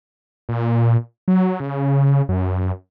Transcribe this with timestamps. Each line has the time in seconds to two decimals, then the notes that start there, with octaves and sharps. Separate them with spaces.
0.49 A#2
1.28 F#3
1.60 C#3
2.29 F#2